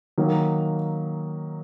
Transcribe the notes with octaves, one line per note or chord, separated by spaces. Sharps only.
D#3 F#3 A#3